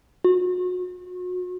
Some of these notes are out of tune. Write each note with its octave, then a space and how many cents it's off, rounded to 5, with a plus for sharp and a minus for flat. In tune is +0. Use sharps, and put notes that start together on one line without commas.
F#4 -35